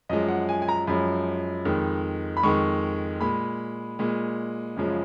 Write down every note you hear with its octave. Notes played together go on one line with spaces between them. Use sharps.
F#2 F3 G#3 D#5
F#5
G#5
G#5
A#5
F#2 F3 G#3 B5
F2 D#3 G#3
B5
F2 D#3 G#3 C#6
A#2 G#3 B5
A#2 G#3
F#2 C#3 F3 G#3